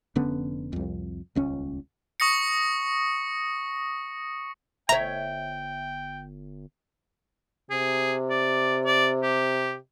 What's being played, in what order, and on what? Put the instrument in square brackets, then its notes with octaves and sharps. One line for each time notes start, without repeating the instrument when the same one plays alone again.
[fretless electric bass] F1 D3 B3 C#4
C2 F2
D#1 C#2 C#4
[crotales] C#6 D#6 A#6 C#7
[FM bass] G1 [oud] C#5 E5 [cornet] G5 [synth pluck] A#5
[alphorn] C3 [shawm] G#4
[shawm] D5
D5
G4